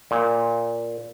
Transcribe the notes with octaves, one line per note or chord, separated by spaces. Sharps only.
A#2